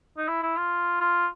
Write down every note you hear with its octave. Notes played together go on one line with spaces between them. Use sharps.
D#4
E4
E4
F4
F4